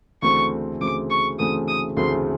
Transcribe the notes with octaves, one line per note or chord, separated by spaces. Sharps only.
D2 C#3 E3 A3 C4 C#6
D2 C#3 E3 A3 C4 D6
C#6
D2 C#3 E3 A3 C4 D#6
D#6
D2 C#3 E3 A3 C4 C6